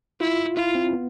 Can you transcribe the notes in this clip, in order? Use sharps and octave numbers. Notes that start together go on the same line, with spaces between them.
E4 F4
E4 F4
C4
B3